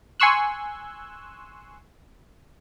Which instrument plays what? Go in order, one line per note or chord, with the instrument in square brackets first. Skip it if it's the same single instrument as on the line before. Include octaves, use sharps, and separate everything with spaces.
[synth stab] G#5 C6 C#6 E6 F#6